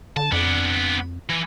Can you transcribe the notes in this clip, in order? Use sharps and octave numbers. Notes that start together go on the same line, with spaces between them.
D3 A5
F2 B3 D4
E3